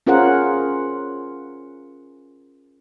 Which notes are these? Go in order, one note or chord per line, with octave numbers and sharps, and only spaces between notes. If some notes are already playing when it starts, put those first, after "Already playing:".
C#4 F4 G#4 A#4 C5 F#5